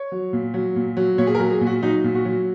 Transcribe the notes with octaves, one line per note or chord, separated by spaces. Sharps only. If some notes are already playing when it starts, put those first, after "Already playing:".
Already playing: C#5
F#3
A#2
F#3
A#2
F#3
A#2 C#5
G#4
A#4
F#3
G#4
A#2
F#4
F#3 D#4
A#2
F#4
F#3